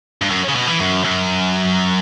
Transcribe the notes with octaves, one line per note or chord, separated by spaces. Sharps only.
G2
F#2
C#3
B2
E3
F#2
F#2